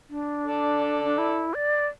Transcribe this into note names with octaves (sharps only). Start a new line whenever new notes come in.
D4
A4 D5
D4
E4
D5